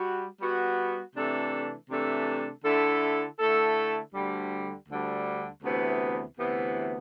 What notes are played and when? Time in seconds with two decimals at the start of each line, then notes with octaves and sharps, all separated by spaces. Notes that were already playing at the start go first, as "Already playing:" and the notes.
Already playing: G3 F#4
0.40 G3 B3 F#4
1.15 C3 E3 A3 D4 A4
1.90 C3 E3 A3 D4 A4
2.64 D3 A3 E4 A4
3.39 D3 A3 E4 A4
4.14 D2 D3 G3
4.89 D2 D3 G3
5.63 D2 C3 E3 B3
6.38 D2 C3 E3 B3